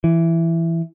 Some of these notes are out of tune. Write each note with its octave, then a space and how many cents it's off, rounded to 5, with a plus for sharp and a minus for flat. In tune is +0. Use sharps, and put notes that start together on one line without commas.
E3 +10